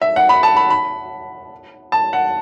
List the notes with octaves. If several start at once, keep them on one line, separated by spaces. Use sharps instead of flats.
E5
F#5
B5
A5
B5
B5
A5
F#5